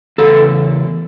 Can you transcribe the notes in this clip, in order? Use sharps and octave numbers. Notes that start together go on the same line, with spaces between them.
E2 C#3 A4